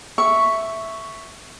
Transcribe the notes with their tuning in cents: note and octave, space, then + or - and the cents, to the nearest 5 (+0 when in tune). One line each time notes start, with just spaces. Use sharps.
E5 +0 C#6 +0